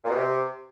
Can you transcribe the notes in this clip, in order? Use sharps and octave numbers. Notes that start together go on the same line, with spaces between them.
A#2
B2
C3